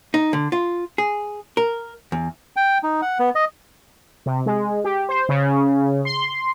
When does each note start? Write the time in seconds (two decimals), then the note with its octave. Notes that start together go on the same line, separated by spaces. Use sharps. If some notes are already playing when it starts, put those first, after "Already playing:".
0.14 D#4
0.33 D3
0.52 F4
0.98 G#4
1.57 A#4
2.12 E2
2.56 G5
2.83 D#4
3.02 F#5
3.19 B3
3.35 D#5
4.26 C3
4.46 G#3
4.84 G4
5.09 C5
5.29 C#3
6.05 C6